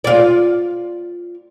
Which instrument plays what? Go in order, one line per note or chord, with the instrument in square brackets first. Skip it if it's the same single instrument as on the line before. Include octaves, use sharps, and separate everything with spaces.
[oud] F4 D5